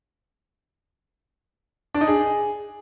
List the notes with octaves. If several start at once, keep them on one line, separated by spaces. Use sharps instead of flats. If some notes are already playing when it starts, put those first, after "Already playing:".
D4
D#4
G#4